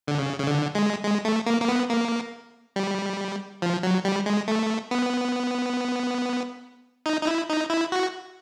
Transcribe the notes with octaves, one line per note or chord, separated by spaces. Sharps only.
D3
C#3
C#3
D3
G#3
G#3
A3
A#3
A#3
B3
A#3
G3
F3
F#3
G3
G#3
A3
B3
D#4
D#4
E4
D#4
E4
F#4